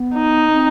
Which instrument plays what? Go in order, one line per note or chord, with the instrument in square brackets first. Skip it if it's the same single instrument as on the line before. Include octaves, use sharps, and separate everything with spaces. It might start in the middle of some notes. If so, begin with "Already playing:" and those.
Already playing: [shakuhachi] B3
[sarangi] D#4
[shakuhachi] C4